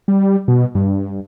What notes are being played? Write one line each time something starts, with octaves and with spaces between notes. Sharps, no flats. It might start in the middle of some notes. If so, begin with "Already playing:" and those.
G3
B2
G2